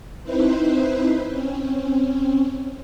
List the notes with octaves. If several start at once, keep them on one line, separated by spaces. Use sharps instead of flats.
C4 D#4 E4 B4 C5
C4 C#4